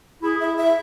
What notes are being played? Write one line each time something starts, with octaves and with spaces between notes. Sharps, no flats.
E4 G#4
E5
E5